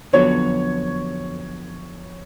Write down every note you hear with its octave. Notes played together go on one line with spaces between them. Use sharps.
F2 D3 F#3 B3 F#4 C#5